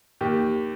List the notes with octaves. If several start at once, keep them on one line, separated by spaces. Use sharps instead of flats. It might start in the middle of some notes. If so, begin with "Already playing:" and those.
D#2 G4